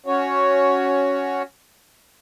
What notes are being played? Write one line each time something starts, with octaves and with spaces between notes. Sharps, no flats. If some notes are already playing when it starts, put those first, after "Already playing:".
C#4 F#4 C#5